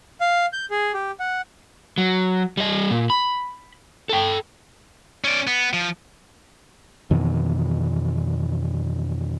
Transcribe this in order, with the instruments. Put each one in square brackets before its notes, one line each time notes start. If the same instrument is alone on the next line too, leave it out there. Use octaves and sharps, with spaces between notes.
[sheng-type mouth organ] F5
G6
G#4
G4
F#5
[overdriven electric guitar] F#3
G3 D#5
A#2
B5
A4 G5
[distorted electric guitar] C#4 D5
B3
F3
[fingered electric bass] F2 B2 D#3 E3